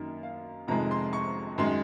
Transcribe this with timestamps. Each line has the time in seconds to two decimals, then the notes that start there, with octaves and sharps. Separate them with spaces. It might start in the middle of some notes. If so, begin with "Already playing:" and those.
Already playing: F#2 D#3 A#3 A#4
0.23 F5
0.68 F1 F2 C3 D#3 G#3 A#5
0.91 C6
1.13 C#6
1.58 F#2 D#3 G#3 C6